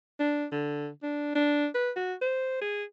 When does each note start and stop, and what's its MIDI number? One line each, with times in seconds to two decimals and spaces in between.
0.20 0.46 62
0.52 0.89 50
1.03 1.33 62
1.35 1.67 62
1.75 1.91 71
1.96 2.14 66
2.21 2.58 72
2.61 2.84 68